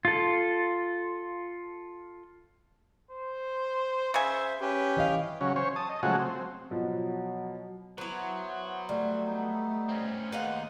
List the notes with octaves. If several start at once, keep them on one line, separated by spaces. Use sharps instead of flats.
F4 A4
C5
C#3 C5 E5 G#5
C#4 G4 B4
E3 D#5 F5
C#3 F#3 C#4
C#4 C5 C#5
A5 D#6
D#5
C#3 F3 F#3 G#3 A3 F#4
C4
B2 F3 F#3
F#3 B3 E4 B4 C5
G3 A3
B3 D#4
C4 C#4
D#2 G#3 A#3 D#4 B4 F5 F#5